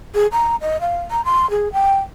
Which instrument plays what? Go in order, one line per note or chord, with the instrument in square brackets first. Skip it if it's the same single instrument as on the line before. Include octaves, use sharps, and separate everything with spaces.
[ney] G#4
A#5
D#5
F5
A#5
C6
G#4
G5